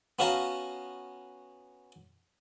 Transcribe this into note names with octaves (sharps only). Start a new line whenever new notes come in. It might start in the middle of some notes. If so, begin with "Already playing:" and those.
B3 C#4 F#4 F5 A5 A#5